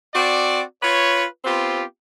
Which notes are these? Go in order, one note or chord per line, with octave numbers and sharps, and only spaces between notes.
C4 F#4 D5
F4 B4 C#5
B3 C4 F4 G4